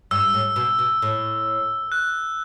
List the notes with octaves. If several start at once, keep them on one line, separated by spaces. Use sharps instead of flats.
G2 E6
A2
B2
B2
A2
F#6